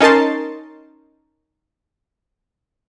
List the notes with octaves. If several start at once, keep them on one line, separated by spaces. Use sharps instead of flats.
C#4 D#4 A#4 A5 C6